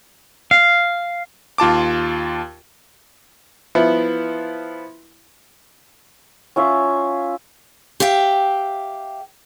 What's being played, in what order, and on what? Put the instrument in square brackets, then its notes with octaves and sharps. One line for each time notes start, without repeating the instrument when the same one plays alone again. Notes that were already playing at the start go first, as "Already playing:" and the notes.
[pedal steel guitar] F5
[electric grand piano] D#2 F4 A5 D6
[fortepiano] F3 B3 E4
[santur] C#4 F4 E5
[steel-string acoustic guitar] G4 E5 F5 G5